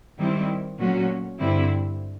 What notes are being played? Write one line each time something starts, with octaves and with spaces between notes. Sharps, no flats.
D#3 G3 C4 E4
A#2 F#3 A3 C#4 F#4
G2 D3 G3 C4 E4